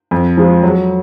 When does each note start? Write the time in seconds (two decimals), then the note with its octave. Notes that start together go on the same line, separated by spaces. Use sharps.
0.11 F2
0.37 F3 G#3
0.63 F#3